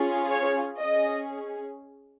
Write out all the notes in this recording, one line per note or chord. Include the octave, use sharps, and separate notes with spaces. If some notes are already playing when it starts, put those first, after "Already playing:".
Already playing: C#4 F4 G#4
C#5
C#4 G#4 D#5